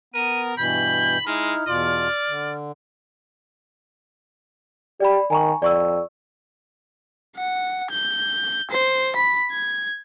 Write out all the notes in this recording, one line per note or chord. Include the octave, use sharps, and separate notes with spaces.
B3 A#4 D#7
G2 B2 E3 B5 G6
G#3 D#4 E4 F6
E2 B2 F4 D5
D3
G4 D5 B5
D#3 G#5 A#5 C#6
F2 D5 C#6 E6
F#5
G6
C5
B5
G#6